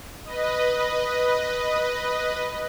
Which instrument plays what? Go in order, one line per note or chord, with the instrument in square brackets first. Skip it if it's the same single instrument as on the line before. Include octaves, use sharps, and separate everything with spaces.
[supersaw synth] B4 D#5